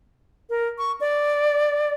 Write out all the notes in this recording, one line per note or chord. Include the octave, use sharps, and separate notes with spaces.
A#4
C#6
D5